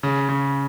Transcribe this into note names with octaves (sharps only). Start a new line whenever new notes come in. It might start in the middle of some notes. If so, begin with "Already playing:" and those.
C#3
C#3